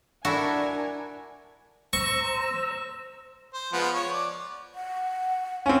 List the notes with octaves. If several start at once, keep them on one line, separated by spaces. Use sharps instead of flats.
D4 E4 F#4 A4 A#4 G#5
C5 A#5 C#6 E6
C5
F3 G#3 B3
C#5
D5
F#5
C4 C#4 F5